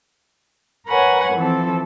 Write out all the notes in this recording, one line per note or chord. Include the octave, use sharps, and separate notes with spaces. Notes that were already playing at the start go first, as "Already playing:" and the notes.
A#4 B4 C#5 F#5 G#5
E3 F3 C4 A4